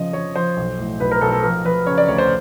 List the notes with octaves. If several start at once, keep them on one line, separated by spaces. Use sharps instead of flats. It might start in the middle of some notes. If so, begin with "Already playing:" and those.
Already playing: C#3 F3 D#5
F3 C#5
F3 C5
B1
A2
B1 B4
A#4
B1 A4
A4
F3 A#4
F3 B4
C#3 C#5
D5
D2 C#5
C5